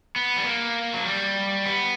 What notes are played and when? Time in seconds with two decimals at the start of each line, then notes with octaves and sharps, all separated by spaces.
0.16 B3
0.37 G3
0.46 A#3
0.94 F#3
1.06 G3
1.66 B3